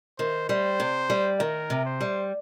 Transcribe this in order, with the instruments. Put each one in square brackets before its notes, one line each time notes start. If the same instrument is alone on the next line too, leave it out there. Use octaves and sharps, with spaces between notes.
[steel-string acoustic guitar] D#3 [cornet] C5
[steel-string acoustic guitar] G3 [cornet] C5
[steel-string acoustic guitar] C3
G3
[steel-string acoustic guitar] D#3 [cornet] A#4
[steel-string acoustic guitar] C3
[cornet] C5
[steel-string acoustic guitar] G3